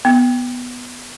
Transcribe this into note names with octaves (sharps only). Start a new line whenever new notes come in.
B3